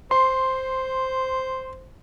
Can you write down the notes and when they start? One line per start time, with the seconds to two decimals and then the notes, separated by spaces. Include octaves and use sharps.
0.11 C5 C6